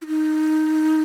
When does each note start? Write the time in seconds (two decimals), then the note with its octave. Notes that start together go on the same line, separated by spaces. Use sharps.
0.02 E4
0.07 D#4